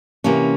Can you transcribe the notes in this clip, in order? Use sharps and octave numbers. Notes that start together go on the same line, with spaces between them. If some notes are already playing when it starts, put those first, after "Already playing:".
C3 E3 A#3 C#4